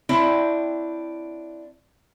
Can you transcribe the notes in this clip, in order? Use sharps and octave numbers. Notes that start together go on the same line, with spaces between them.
C4 D4 E4 C#5